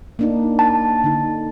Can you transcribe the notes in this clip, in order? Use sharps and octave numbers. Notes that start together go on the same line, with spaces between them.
A#3 D4 D#4
A5
D3 D#4